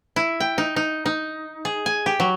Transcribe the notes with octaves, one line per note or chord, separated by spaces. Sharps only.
E4
G5
D#4
D#4
D#4
G#4
G#5
G4
F#3